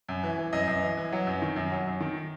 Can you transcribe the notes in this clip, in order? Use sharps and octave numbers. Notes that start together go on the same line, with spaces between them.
F#2
E3
E3
F#2 D#5
F#2
E3
E3
F#3
F#2
D#3
F#2
F#3
F#2
D#3